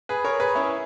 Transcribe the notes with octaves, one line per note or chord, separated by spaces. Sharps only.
G#4 B4
A#4 C#5
G#4 B4
C#4 E4